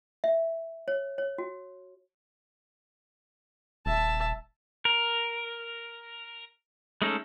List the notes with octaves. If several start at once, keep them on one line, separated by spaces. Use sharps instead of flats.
E5
C#5
C#5
F#4
D#1 E5 A5
A#4
G#3 A3 C#4 D#4 A4